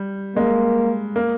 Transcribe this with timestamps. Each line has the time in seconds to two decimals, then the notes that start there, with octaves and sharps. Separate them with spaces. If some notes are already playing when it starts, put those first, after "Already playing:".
Already playing: G3
0.36 G#3 A#3
1.16 A#3